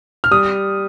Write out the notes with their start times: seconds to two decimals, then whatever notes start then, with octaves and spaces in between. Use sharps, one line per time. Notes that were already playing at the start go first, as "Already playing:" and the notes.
0.24 F6
0.31 G3 D#6